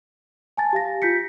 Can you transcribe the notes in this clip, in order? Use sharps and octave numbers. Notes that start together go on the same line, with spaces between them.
G#5 A5 A6
G4 F5 A#6
F4 G6 B6 C#7